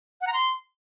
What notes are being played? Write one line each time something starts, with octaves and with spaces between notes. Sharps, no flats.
F#5
A#5
C6